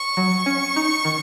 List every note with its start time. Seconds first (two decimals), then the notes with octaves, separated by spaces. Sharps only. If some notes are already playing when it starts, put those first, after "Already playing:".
Already playing: C#6
0.17 F#3
0.46 C#4
0.76 D#4
1.05 D#3